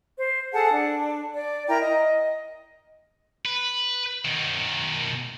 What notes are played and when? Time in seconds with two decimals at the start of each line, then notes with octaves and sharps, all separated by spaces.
0.16 C5
0.53 G#4 A4 F#5 A5
0.71 D4
1.34 D5
1.68 E4 A#4 G5 A#5
1.80 D#5
3.45 B4
4.25 B2 D#3